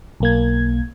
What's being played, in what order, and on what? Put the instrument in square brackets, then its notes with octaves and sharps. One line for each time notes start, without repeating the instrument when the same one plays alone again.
[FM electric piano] B1 A#3 G#6